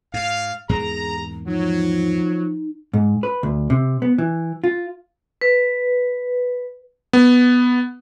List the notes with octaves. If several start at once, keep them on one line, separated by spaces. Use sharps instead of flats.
G#2 F5
E2 G#2 A#3 G#4 A#5
F3 F#3 D#4
G#2
B4
D2
C3
B3
E3
F4
B4
B3